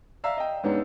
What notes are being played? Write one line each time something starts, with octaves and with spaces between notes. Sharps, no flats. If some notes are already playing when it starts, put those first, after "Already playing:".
D5 E5 F5 A#5 E6
D#5 G5
G#2 G#3 B3 C#4 D4